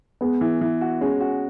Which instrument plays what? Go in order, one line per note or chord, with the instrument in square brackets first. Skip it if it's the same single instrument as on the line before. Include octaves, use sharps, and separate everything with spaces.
[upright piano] G#3 [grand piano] B3
[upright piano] E3
E3
F#4
[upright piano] G#3 [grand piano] C#4
[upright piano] F#4